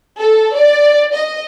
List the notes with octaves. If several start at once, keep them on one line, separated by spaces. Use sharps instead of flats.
A4
D5
D#5